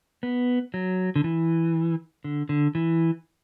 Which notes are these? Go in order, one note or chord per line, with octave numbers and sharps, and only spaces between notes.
B3
F#3
D3
E3
D3
D3
E3